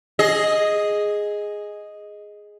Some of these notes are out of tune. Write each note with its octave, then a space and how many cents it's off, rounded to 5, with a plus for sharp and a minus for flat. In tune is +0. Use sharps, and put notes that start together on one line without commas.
G#4 +0 D#5 +0